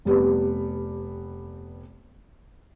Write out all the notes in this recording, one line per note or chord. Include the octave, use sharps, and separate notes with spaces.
F1 G3 B3